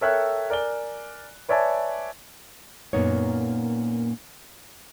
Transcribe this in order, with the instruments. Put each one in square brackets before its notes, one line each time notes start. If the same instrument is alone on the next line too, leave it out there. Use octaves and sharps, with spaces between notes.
[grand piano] A4 A#4 C#5 E5 G5 F#6
A#4 D5 G#5 G7
B4 C#5 D5 E5 G#5 A5
[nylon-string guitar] F#2 A#2 A#3 B3 D#4 C#5